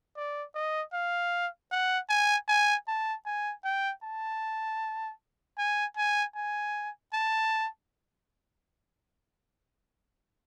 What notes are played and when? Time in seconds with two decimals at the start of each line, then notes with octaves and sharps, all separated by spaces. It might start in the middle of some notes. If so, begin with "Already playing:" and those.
0.16 D5
0.55 D#5
0.93 F5
1.72 F#5
2.09 G#5
2.48 G#5
2.87 A5
3.26 G#5
3.64 G5
4.03 A5
5.58 G#5
5.97 G#5
6.35 G#5
7.13 A5